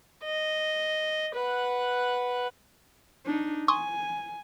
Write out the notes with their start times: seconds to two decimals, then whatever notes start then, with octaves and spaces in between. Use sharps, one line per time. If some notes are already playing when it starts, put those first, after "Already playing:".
0.24 D#5
1.35 B4 F#5
3.25 D4 D#4
3.68 G#5 C6 C#6 D#6